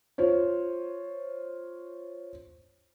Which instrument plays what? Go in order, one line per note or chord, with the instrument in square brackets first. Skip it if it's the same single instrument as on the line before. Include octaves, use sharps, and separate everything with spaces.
[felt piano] F4 C5 C#5